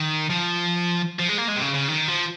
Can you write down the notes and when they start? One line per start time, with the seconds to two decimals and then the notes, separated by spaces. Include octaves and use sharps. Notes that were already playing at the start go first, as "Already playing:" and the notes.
Already playing: D#3
0.30 F3
1.19 F3
1.29 G#3
1.38 A#3
1.48 G#3
1.56 C3
1.62 C#3
1.74 C#3
1.88 D#3
2.08 F3